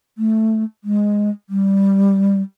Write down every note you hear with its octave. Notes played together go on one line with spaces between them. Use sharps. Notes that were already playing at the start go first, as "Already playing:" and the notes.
A3
G#3
G3